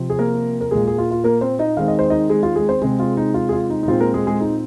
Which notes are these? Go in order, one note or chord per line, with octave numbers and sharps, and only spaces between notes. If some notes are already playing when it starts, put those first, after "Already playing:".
Already playing: C3 F3 C4
G#4
A#3 A#4
A#4
A#2 G#3 A#3 G#4
G#4
F4
F4
A#3 A#4
C4 C5
D#4 D#5
D#3 G#3 C4 F5
D#5
C5
D#4 D#5
G#3 G#4
F4
G#3 G#4
C4 C5
C3 G#3 C4 G#4
F4
D#4
F4
G#4
F4
D#4
D#4
A#2 G#3 C4 F4
A#3 A#4
G#3 G#4
G#3 G#4
D#4